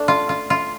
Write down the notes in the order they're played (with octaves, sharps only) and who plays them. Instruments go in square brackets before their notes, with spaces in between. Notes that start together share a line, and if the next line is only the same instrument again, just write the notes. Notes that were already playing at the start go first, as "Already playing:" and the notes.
Already playing: [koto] A3 D4
F4
F4
F4